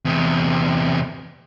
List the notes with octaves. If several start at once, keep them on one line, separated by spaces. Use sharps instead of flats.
E2 C3